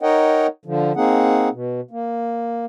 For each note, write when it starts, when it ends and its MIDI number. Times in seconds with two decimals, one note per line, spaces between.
0.02 0.47 63
0.02 0.47 70
0.02 0.47 73
0.02 0.47 75
0.02 0.47 78
0.02 0.47 79
0.66 0.92 50
0.66 0.92 53
0.96 1.49 58
0.96 1.49 60
0.96 1.49 63
0.96 1.49 68
0.96 1.49 78
1.52 1.81 47
1.91 2.66 58